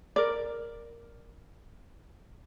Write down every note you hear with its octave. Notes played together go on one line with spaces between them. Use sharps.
A#4 D5